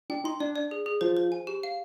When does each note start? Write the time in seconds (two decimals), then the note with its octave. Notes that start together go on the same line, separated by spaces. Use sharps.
0.10 D4 G5
0.24 D#4 C6
0.40 D4 D5
0.56 D5
0.71 G#4
0.86 G#4
1.01 F3 C5
1.17 C5
1.32 G#5
1.47 G4
1.63 F5